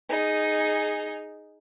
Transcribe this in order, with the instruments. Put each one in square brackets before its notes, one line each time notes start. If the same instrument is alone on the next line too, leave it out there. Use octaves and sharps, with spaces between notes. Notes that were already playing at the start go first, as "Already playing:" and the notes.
[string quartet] D#4 G#4